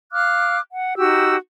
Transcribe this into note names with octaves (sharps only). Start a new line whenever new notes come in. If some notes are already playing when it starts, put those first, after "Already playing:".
F5 D6 F6 F#6
F#5
D#4 F#4 G4 E6